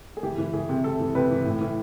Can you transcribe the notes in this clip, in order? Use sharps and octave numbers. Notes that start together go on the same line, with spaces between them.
G#4
E3 G4
E3
E3 G#4
C3
C3 A4
E3
C3 B4
E3
A2
E3